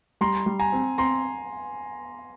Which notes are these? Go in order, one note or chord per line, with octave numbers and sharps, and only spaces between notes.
G3 A#5 C6
G3
G#5 A#5
C4
C4 A#5 C6